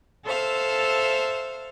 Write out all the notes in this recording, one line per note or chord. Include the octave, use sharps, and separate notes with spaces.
A4 C5 E5 F5